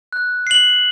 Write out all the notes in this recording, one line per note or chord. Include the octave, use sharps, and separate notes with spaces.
F#6
C7 F#7